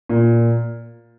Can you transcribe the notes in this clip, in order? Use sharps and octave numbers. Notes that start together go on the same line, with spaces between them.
A#2